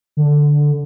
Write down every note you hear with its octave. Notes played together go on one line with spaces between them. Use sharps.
D3